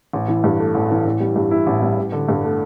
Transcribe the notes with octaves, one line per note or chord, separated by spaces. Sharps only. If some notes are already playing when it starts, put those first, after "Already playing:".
A1
E3
G2
A3
A1
E3
A1
G3
G2
E4
A1
G3
A1
D3
G2
A3